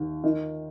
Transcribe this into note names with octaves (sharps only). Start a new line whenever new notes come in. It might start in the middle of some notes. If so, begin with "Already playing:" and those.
Already playing: D#2
D#3